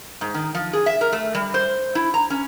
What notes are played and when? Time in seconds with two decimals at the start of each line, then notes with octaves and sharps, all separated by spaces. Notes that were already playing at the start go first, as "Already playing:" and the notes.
0.21 G#2
0.34 D#3
0.55 F3
0.73 G#4
0.86 E5
1.01 A#4
1.13 A3
1.35 G3
1.54 C5
1.95 E4
2.14 A#5
2.30 C#4